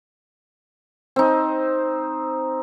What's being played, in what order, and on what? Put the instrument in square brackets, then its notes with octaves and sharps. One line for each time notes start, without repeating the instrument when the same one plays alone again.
[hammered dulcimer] C4 D#4